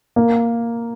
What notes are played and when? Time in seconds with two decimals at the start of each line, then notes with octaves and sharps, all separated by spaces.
0.16 A#3